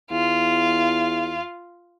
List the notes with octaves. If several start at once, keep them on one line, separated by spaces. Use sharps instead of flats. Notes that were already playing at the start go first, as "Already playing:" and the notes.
E2 F4